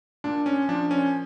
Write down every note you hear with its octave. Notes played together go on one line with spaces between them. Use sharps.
A#2 D4
C#4
F3 D4
C#4